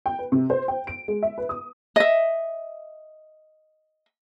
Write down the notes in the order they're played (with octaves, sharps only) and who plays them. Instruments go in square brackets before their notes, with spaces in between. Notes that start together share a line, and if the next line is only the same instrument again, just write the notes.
[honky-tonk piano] G5
B4
C3
C5
G5
D7
G#3
E5
B4
D#6
[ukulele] D#5 E5